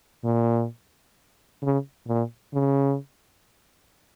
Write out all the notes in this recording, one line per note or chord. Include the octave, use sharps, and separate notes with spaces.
A#2
C#3
A#2
C#3